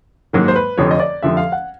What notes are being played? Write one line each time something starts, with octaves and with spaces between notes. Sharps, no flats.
G#2 D#3 F#3 A#3
C5
B4
F1 F2 D3 F3 C#5
D#5
D5
F1 F2 D3 F3 E5
F5
F#5